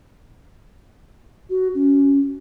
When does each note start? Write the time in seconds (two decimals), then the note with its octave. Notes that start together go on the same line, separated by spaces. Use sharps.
1.50 F#4
1.75 C#4